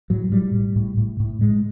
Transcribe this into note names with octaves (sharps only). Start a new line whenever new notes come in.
A2 F#3
A2 G3
A2
A2
A2
A2
A2 G#3